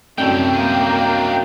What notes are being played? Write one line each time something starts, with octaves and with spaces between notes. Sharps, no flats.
C2 F#2 A2 D3 A3 G5
A#3 D4 D#5